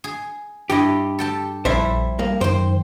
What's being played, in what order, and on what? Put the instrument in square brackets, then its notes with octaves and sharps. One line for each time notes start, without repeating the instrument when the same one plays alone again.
[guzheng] G#4
[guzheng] G2 E4 D#5 [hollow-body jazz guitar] G4
[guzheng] A4 G5 A5
[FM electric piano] A#1 [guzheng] F2 G3 E4 [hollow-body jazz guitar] C5 E5
[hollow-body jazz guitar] G2 A#3
[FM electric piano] F#2 D#3 [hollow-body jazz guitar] C5 [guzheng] G5 C6